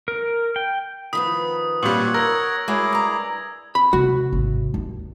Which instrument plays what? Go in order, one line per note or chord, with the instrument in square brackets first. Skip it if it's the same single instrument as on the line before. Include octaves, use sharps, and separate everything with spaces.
[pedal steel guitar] A#4
G5
[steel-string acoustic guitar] D#3 F3 B3 [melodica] B5 [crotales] D#6
[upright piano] A#2 G3 [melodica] C#5 F#5 [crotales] F#7
[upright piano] A#4 [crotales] E6 G#6 A#6
[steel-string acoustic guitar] G#3 F#4 C#5 [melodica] E4 G#4 D6
[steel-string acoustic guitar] G2 A#5
[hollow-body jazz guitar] B5
[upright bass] D#2 C3 [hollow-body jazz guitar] F#4
[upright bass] G#1 C3
D#2